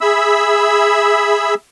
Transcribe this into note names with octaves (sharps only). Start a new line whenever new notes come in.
G#4 E5 B5 E6